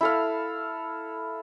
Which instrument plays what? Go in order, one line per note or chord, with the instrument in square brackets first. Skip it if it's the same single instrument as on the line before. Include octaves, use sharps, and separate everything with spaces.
[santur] E4 A4 F5